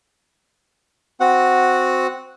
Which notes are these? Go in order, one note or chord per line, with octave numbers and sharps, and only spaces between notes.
C4 F#4 F#5